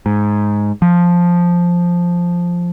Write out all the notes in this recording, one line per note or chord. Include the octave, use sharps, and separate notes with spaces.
G#2
F3